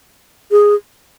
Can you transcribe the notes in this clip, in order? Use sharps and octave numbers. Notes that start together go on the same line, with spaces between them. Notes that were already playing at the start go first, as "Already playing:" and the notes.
G#4